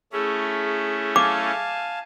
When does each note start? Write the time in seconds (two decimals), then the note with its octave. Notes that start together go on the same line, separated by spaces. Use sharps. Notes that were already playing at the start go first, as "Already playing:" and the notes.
0.13 A3 C#4 E4 G#4
1.16 F5 G#5 A5 D6